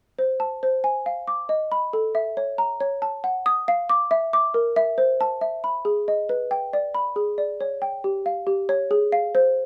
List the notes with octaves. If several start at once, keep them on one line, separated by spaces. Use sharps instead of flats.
C5
A5
C5
G#5
F5
D6
D#5
B5
A4
E5
C#5
A#5
C#5
A5
F#5
D#6
F5
D6
E5
D6
A#4
E5
C5
A5
E5
B5
G#4
D#5
B4
G5
D5
B5
G#4
D5
C#5
G5
G4
F5
G4
C#5
G#4
F5
C5